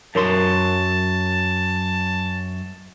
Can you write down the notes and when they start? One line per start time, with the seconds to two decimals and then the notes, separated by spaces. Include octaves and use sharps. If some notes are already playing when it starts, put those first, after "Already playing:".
0.15 F#2 F#3 A#4 A5 C6